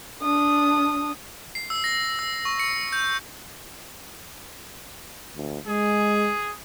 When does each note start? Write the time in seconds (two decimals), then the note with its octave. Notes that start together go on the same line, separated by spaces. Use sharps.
0.22 D4 D#6
1.55 C7
1.70 E6
1.84 A#6
2.19 E6
2.45 C#6
2.60 C#7
2.93 G6
5.36 D2
5.67 G#3 G#4